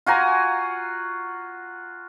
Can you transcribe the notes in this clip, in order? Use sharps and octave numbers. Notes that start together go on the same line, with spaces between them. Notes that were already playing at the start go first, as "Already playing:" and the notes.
F4 F#4 G#5 A#5